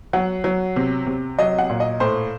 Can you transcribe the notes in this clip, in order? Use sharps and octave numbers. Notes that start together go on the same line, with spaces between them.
F#3 F#5
F#3
C3
C3
F#3 D#5
F#5
A#2
D#5
A2 C5